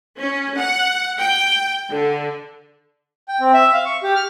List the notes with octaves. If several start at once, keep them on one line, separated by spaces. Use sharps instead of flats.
C#4
F#5
G5
D3
G5
C4
E5
F5
C#6
G4
F6